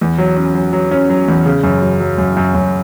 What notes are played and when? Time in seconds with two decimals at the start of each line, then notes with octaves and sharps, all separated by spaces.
0.01 E2
0.18 F#3
0.37 C#4
0.55 F#3
0.73 F#3
0.91 C#4
1.10 F#3
1.28 E2
1.46 C#3
1.64 F#2
1.82 F#3
2.00 F#3
2.18 F#2
2.37 F#2
2.55 F#2